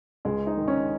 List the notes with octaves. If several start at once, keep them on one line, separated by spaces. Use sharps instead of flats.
C#2 G#3
D#4
D#3
C#4